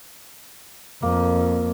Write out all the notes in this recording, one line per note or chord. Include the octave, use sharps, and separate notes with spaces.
F2 A#3